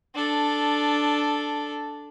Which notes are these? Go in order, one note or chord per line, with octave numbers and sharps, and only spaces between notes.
D4 A4